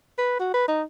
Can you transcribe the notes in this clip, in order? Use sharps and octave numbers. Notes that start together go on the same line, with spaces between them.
B4
F#4
B4
D#4